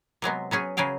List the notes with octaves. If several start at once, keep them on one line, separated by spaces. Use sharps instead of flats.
C3 F#3 G#3 B3
F#3 B3 C#4 G#4
C#3 F#3 G#4 F5 G5